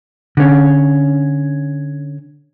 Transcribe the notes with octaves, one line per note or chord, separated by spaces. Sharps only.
D3 C#4